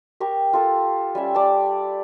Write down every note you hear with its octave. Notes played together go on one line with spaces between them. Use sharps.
G4 A#4 C#6
F4 A4
G3 C#4 E5
D5 A5